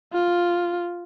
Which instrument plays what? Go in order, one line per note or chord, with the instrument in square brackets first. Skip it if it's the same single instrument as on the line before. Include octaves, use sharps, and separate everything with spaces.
[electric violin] F4